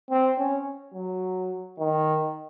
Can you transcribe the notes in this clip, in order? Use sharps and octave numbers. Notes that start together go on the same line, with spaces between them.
C4
C#4
F#3
D#3